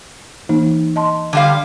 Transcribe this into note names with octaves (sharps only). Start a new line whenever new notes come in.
E3 A#3 D#4
D#5 A5 C6
D3 G3 F5